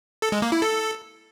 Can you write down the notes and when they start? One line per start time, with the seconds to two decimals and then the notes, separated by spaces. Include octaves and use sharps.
0.22 A4
0.32 G#3
0.42 A#3
0.52 E4
0.62 A4